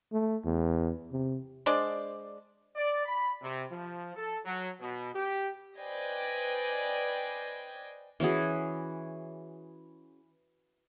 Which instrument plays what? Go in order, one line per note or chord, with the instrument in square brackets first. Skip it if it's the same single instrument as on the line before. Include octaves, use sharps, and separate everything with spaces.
[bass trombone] A3
E2
C3
[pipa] G#3 D4 C5 D5
[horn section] D5
B5
C3
F3
A4
F#3
B2
G4
[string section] B4 C5 D5 D#5 G5 G#5
[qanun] E3 C#4 F#4 G#4